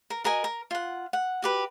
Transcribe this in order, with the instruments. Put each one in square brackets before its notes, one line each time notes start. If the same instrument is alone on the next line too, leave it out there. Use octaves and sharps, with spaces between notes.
[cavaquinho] A#4
F#4 A#4 D#5 G#5
A#4
F4 F#5
F#5
F#4 G4 B4